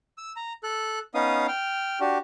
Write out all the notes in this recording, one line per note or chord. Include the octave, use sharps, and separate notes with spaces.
E6
A#5
A4 F#6
B3 C#4 D#4 F5 D#6
G5 F6
D4 F#4 G4